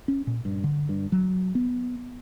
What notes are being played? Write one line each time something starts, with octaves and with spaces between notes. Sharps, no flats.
C#4
A#2
G2
D3
G2
F#3
B3